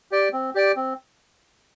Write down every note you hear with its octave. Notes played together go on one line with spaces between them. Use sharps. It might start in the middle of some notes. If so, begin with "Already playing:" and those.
G4 D5 G5
C4
G4 D5 G5
C4